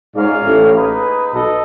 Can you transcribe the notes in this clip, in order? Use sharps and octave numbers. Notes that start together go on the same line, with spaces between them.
G#2 C#4 F4 A#4 D5 F5
A1 A2
A#3 D#4 G#4 B4
B1 B2 A4 D#5